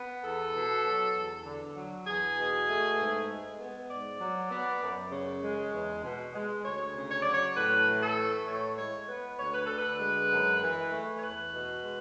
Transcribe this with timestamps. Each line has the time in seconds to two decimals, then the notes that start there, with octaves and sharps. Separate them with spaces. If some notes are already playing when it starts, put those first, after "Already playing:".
Already playing: B3
0.23 E2 A4
0.55 B2
0.84 F#3
1.15 E2
1.46 D3
1.76 F#3
2.07 E2 G#4
2.38 B2
2.68 A3
2.99 G#2
3.29 G#3
3.59 B3
3.90 G#2 D5
4.20 F#3
4.51 B3
4.82 F#2
5.12 C#3
5.43 G#3
5.73 E2
6.03 B2
6.35 G#3
6.65 D2 C#5
6.96 C#3
7.11 C#5
7.22 F#3 D5
7.32 C#5
7.56 A2 B4
7.87 E3
8.02 A4
8.17 A3
8.47 A2 C#5
8.78 G#3 C#5
9.08 B3 B4
9.39 D2 C#5
9.53 B4
9.66 D3 A4
9.79 B4
10.00 G#3
10.31 F#2
10.62 E3
10.92 A3
11.18 C#5
11.22 E2 B4
11.54 B2
11.84 G#3